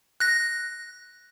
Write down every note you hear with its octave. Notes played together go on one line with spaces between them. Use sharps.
F#6 A#6